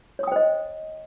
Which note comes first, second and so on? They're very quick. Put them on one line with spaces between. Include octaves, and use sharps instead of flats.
C#5 D#6 G5 C5 D#5